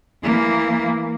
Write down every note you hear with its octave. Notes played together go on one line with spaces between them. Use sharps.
E3 A#3